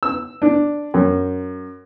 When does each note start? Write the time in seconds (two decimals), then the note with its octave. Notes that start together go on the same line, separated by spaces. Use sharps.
0.03 E6
0.42 D4
0.94 F#2